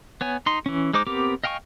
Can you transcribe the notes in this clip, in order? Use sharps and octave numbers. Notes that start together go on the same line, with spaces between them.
B3 C#5 G#5
D#4 C6
E3 C#4
G#3 D#4 C5 D6
B3 C4 G4 A#4 D6
D#5 F5 G5 G#5 C#6